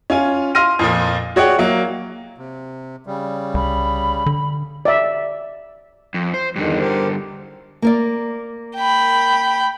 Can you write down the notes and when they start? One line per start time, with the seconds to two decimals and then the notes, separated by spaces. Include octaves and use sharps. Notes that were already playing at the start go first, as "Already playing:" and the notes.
0.10 C#4 F4 G#5
0.55 F5 C6 F6 A#6 D#7
0.79 F2 A#2 F3
1.36 F#4 G#4 C#5 D5 F#5 G5
1.59 F#3 A#3
2.38 C3
3.07 C#3 G3
3.54 C2 B5
4.26 D3
4.85 D5 E5
6.14 F2
6.34 C5
6.56 E2 G2 D3 D#3
6.80 G4 A#4 C5
7.82 A#3 A#4 D5
8.76 G5 B5